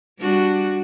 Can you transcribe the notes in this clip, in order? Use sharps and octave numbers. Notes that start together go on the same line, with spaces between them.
G3 D4 F#4